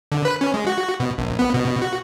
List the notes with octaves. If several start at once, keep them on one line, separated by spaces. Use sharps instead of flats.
D3
B4
C#4
G#3
F#4
B2
A#1
B3
B2
F#4